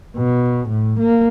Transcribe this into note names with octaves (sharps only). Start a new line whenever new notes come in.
B2
A2
A#3